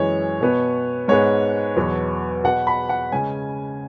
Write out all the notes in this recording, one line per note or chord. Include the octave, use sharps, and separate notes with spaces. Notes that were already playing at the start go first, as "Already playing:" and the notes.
Already playing: F#2 E3 G#3 C#5
B2 B3
G#2 G#3 B3 C#5
E2 B2 F#3 B3
B2 B3 F#5
B5
F#5
C#3 G#3 C#4 G#5